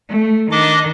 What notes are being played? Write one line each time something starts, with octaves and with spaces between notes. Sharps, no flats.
A3
D#3 D4 D#5 D6